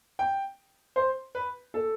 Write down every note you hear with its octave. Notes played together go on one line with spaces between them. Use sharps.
G5
C5
B4
A4